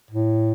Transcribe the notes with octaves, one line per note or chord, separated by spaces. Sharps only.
A2